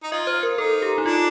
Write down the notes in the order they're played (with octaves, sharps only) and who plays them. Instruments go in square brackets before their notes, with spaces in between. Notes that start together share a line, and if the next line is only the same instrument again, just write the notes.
[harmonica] D#4
[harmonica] F4 [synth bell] D#5
[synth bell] C5
A#4
[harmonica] D#4 [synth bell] A4
[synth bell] G4
D#4
[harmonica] D4 [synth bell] F4